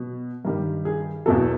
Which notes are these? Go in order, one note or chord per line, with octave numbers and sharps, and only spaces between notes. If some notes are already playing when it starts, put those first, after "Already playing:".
Already playing: B2 F#3
G2 D#3 G3 A#4
G#4
E2 B2 F#3 A4